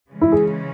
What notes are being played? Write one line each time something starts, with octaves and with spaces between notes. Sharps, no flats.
C#3 E3 G#3 C#4
E4
G#4